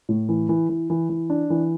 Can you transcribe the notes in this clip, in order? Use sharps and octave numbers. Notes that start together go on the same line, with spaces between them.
A2
E3
E3
E3
E3
E3
D4
E3